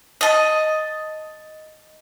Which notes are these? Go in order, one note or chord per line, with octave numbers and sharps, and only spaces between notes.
D#5 A5